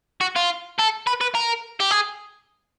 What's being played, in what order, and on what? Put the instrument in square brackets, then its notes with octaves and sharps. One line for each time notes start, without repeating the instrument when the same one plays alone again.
[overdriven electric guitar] F#4
F4
A4
B4
B4
A#4
G4
G#4